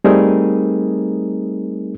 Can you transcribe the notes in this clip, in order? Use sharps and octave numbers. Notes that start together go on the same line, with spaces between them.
G3 A3 C4 D#4 G#4 A#4